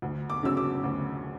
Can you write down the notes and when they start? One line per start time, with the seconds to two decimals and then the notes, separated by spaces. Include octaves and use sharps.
0.02 D2
0.30 D6
0.43 C#3 F#3 C#4 E6
0.57 D6
0.84 D2